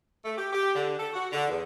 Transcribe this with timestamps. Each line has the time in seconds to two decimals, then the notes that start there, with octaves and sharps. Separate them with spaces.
0.24 A3
0.38 G4
0.53 G4
0.75 D3
0.98 A4
1.13 F#4
1.32 D3
1.48 E2